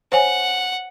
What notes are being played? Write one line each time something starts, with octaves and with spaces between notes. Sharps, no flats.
C5 C#5 F#5 G#5